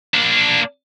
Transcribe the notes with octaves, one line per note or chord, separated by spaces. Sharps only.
A#3 D4